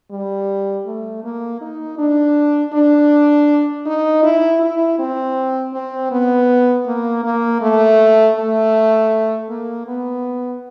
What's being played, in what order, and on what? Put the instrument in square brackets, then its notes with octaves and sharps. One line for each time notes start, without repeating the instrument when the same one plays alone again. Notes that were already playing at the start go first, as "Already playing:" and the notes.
[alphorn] G3
A3
A#3
D#4
D4
D4
D#4
E4
E4
C4
C4
B3
A#3
A#3
A3
A3
A#3
B3